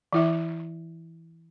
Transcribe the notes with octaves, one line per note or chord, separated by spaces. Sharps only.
E3 E4 E5